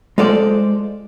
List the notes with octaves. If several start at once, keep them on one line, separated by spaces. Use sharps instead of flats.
G#3 F4 A4 C5 D5